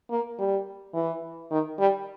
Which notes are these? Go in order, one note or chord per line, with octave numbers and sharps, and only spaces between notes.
A#3
G3
E3
D#3
G3